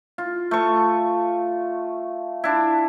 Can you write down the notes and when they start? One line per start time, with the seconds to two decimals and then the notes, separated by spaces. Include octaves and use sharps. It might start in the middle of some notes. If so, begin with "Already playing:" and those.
0.18 F4
0.51 A3 C#6
2.44 D4 E4